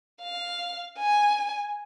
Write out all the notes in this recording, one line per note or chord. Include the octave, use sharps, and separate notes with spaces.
F5
G#5